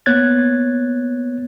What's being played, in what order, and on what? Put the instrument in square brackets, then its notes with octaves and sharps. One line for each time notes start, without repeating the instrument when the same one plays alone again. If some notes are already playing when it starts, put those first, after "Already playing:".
[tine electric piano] A#3 B3 C#5 F#6 G#6 A6